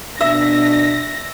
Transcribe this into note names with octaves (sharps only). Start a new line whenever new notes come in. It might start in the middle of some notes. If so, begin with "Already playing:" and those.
B2 D4 E5 E6 A#6